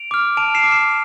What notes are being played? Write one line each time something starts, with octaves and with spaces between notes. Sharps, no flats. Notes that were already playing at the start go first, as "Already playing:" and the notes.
Already playing: D7 F7
D6 F6
A5 D7 F7
C7 E7
D6 F6
C7 E7